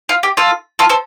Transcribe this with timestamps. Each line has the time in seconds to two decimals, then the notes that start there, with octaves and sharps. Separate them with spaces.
0.09 F4
0.23 G4
0.37 F4 A4
0.79 F4 A4
0.89 A4 C5